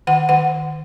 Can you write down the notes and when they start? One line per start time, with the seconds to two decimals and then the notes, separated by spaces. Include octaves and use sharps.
0.07 D#3 F#5
0.29 D#3 F#5